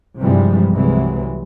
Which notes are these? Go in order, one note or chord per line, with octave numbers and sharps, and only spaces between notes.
G2 C3 E3 F3 G3 G#3
C2 C3 E3 F#3 G#3